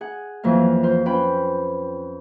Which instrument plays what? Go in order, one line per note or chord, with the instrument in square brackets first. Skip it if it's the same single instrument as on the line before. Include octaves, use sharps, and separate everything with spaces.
[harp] G#4 F#5
F2 E3 F#3 A#3 F5
F4 C5
C#4 F4 B4 C5 G5 B5